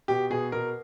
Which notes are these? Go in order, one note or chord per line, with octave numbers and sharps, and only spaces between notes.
B2 G4
B2 G#4
B2 A#4